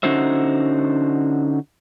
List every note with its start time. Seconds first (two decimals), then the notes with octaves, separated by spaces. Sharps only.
0.03 D3 C#4 D#4 F#4 C5 E5